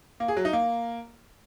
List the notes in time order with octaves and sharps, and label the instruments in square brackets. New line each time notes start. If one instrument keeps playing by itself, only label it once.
[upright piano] A#3
G#4
F#3
D#4
A#3